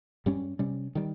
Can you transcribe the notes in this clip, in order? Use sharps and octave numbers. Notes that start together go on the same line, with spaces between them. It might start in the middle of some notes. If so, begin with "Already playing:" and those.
G2 G3 C#4
C3 G3 C#4
D#3 G3